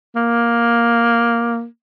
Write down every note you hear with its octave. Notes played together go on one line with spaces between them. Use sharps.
A#3